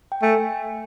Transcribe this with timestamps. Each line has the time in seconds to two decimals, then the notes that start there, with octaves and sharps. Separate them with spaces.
0.12 G5
0.22 A3 G#5